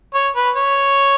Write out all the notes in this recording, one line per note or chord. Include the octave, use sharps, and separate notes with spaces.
C#5
B4
C#5